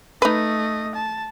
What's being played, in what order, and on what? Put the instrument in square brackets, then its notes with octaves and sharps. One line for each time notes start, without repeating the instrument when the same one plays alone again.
[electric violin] A3 D#5 [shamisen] D#4 B4
[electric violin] A5